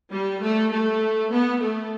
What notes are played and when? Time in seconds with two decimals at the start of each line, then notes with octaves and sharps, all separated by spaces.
0.12 G3
0.42 A3
0.72 A3
1.32 B3
1.62 A3